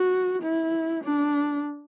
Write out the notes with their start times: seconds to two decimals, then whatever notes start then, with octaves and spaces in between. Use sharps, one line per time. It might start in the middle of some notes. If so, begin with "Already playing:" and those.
Already playing: F#4
0.42 E4
1.04 D4